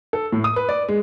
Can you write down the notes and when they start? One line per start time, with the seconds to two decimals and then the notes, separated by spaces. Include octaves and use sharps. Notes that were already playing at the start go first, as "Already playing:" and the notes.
0.13 A4
0.32 A2
0.44 D#6
0.56 B4
0.69 D5
0.89 G#3